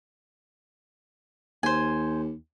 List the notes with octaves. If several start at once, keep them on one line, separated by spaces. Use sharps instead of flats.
D#2 C5 G#5